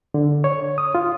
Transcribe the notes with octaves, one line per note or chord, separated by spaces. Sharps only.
D3
C#5
D#6
F4